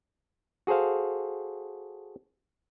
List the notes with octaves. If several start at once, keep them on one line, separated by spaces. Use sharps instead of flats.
F#4 G#4 A4 C5 F5